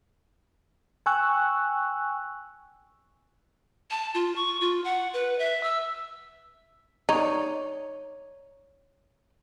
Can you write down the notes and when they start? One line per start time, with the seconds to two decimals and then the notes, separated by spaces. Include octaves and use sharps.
1.06 G5 G#5 C#6 E6 F#6
3.91 A5
4.14 F4
4.36 C#6
4.61 F4
4.84 F#5
5.14 B4
5.39 E5
5.63 E6
7.09 D#4 C#5 D5